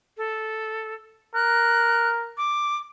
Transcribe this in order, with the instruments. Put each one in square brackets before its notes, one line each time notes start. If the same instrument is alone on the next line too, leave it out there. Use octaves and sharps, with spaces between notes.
[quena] A4
[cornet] A#4 [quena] F#6
[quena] D6